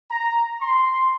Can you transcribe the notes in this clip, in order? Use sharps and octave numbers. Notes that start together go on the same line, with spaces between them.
A#5
C6